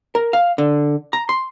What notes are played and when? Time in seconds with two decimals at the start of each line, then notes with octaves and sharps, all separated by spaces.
0.15 A#4
0.33 F5
0.58 D3
1.13 A#5
1.29 C6